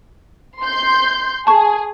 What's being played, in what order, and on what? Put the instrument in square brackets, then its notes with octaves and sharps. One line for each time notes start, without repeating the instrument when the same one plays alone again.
[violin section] C6 G6
[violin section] G#4 [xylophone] A5 C#6